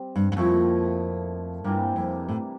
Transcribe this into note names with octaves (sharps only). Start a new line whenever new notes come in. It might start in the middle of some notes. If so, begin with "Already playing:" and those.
Already playing: G3 C4
G2
G2
F2 A#2 F3 A3 E4
G2 C3 E3 G3 A#3
F2
A2